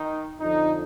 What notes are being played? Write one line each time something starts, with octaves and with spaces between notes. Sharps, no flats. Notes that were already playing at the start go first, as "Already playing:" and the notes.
Already playing: D#3 D#4
F2 D3 F3 D#4